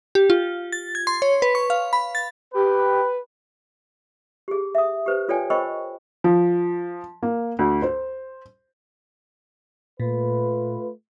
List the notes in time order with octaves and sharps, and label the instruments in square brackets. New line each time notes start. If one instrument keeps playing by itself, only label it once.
[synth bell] G4
F4
A6
G#6
C6
C#5
B4
C#6
F5
B5
A6
[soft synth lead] G4 [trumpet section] B4
[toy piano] G4 G#4
E5 D#6
G4 B4 C5
F4 A4 C#5 D5 G5 G#5
A#4 C5 D#5 G5 B5 C#6
[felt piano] F3
A#3
D2
C5
[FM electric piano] A#2 [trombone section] A3 F4 B4